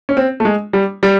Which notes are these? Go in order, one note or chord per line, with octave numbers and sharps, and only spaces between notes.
C#4
C4
A3
G#3
G3
G3